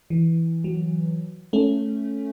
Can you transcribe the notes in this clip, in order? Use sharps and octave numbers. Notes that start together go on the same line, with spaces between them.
E3
F#3
A3 C#4